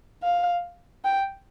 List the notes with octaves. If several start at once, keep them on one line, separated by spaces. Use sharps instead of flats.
F5
G5